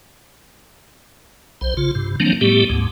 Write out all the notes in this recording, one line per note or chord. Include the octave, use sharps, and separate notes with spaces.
B1 C5
C#3 F4
G2 C3
D#3 F3 F#3 A#3 C4 D4
A2 G3 A3 B3 G4
D2 G#2